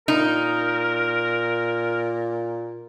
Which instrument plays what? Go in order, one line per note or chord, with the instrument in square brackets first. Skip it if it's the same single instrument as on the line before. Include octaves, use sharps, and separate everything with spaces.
[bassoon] A#2 [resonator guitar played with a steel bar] D#4 [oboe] A#4